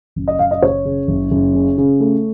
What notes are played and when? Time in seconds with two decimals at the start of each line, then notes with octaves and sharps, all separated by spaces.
0.16 F#1
0.28 D#5
0.39 F#1 F5
0.51 D#5
0.62 F#1 C#5
0.85 C#3
1.08 F#1
1.31 F#1
1.54 C#3
1.78 C#3
2.00 A3